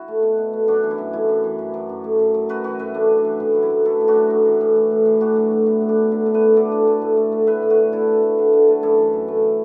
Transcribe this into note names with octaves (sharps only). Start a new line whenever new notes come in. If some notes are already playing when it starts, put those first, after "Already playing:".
Already playing: E4 F#4
A3
B2
B2
A3
F#2 D4 F#4
E3
E4
F#2
A3 E4
F#2
E3
F#2
F#3
F#2
A3
F#2
F#3
F#2 F#4 B4
E3 F#4 B4
F#2 B4 E5
A3 D4
F#2
D4
E3
A2 E4
F#3
E4
A2
A3 E4 A4
A2
D4 F#4
F#3
A2
E3
A2
A3
A2
E3
A2 D4 F#4
F#3
A2
B3 E4
A2
D4
F#3
D3 E4
A3
B4 E5
A3
D3 A4 D5
D3
A3
A2
A3
A3
A2 B4 E5
A2
F#4 B4
A3
D3 E4 A4
A3
A3
D3
D3
A3
F#2 E4 A4
E3
F#2
A3